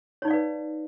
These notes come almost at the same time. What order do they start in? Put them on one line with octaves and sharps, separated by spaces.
C#5 D#4 D5 F5 B4